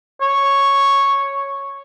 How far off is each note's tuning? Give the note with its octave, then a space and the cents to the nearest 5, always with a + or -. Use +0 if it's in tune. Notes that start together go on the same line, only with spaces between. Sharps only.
C#5 -5